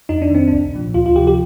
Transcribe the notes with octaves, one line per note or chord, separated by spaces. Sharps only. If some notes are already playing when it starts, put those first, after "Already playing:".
F2 D#4
D4
D#3 C4
C2 D4
A#2 F3
D2 F4
F4
C3 F3 G4
G4